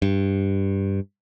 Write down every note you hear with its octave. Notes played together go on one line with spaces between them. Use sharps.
G2